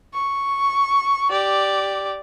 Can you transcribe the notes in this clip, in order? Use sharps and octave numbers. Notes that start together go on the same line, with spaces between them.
C#6
G4 D5